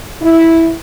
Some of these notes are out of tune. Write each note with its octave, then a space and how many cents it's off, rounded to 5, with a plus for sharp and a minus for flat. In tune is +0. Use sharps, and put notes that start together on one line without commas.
E4 -5